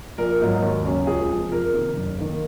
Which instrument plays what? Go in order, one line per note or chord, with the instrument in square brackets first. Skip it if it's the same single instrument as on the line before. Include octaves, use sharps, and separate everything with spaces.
[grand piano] A#1 A#4
G#2 F#3 A#3 D#4
D#2
C#3 F#3 C#4
C#2 G#4
C3 F3
F2 A#4
C3 D#3
F#1
D#3 A#3